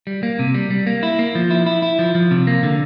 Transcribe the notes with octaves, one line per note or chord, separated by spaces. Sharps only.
G3
A#3
C3
G3
G3
A#3
E4
A#3
F3
E4
E4
E4
F3
F3
C3
A#3
D3